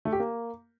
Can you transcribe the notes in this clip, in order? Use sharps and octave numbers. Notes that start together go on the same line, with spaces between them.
A3
G4
A#3